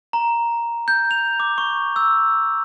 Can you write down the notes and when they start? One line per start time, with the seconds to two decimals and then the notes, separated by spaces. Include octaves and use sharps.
0.13 A#5
0.88 G6
1.11 F7
1.40 D6
1.58 C#6
1.96 E6